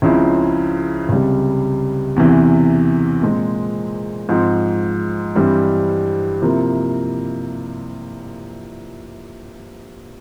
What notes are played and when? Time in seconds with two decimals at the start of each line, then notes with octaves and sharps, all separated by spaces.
0.02 C#2 C#3 F3 C4 E4
1.09 C#2 C3 G3
2.16 E2 C3 E3
3.22 A#2 G#3 C4
4.29 G#2 F3 C4
5.36 G2 E3 G3 C4
6.42 C3 F3 A#3 E4